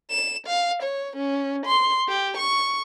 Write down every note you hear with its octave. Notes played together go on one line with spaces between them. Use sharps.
E7
F5
C#5
C#4
C6
G4
C#6